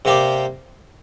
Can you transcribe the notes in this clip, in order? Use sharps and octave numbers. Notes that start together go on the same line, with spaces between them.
C3 A#3 G4 D5